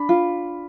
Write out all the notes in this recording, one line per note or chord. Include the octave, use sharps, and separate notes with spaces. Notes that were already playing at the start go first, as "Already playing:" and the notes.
Already playing: D4 B5
F4